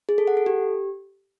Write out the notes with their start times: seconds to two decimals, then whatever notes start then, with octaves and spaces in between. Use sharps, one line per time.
0.09 G#4
0.18 A4
0.27 F#5
0.37 A4
0.46 G4